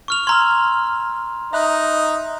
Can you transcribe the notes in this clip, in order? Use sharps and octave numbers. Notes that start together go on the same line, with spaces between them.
C#6 F6 F7
A#5 C6 E6 F6 G#6
D#4 E5 B5 F#6